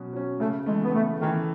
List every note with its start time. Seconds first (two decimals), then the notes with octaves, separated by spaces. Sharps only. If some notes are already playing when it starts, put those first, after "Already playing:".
Already playing: B2 F#3 C#4
0.13 F#3 C#4
0.40 C#3 A3
0.66 E3 G#3 A3
0.83 B3
0.93 C#3 A3
1.20 D#3 E3 A3